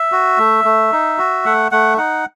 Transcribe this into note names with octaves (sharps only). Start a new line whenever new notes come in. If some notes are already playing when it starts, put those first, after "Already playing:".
Already playing: E5
F#4
A3
A3
D#4
F#4
A3 F#5
A3 F#5
D#4 F#5